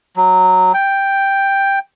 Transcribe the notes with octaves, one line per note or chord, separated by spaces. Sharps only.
F#3
G5